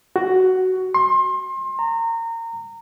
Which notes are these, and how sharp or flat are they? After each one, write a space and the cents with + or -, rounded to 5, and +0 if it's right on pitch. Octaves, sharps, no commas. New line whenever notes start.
F#4 +10
C6 +30
A#5 -25